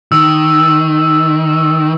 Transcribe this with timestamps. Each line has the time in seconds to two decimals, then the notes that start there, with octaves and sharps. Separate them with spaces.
0.12 D#3 E6